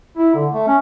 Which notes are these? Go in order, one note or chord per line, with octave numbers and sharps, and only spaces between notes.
E4
D3
A3
C#4